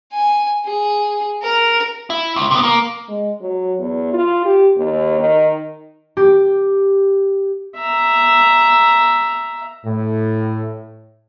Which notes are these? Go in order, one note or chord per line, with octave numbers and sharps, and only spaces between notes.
G#5
G#4
A#4
E4
C#2
C3 B3
A#3
G#3
F#3
E2
F4
G4
D#2
D#3
G4
E5 A#5
A2